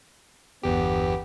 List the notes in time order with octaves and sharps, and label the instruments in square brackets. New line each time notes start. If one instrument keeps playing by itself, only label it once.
[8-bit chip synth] G1 E2 G4 [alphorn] B3